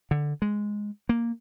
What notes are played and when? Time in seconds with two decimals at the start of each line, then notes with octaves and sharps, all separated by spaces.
0.11 D3
0.42 G#3
1.09 A#3